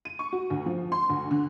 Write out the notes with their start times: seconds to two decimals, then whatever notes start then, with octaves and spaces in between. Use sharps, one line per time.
0.05 D#7
0.19 C#6
0.32 F#4
0.50 D2
0.66 F3
0.92 C6
1.10 D2
1.31 D3